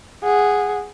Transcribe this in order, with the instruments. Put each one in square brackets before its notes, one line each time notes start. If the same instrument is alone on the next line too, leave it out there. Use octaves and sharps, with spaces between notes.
[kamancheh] G#4 F#5